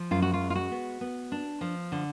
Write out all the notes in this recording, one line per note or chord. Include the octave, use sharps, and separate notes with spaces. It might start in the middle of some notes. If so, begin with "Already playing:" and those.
Already playing: F3
F#2 F4
F#4
F4
G#3
F4
F#4
B3
B3
D4
F3
D3